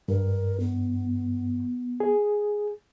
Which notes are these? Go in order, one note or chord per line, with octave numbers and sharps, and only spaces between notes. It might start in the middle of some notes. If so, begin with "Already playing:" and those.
G2 A#4
B3
G#4